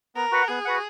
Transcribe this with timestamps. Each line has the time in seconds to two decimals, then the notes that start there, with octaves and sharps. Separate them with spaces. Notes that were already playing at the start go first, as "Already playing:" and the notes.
0.15 B3 A#4
0.32 F#4 B4 F#5
0.48 B3 G#4
0.65 F#4 B4 F#5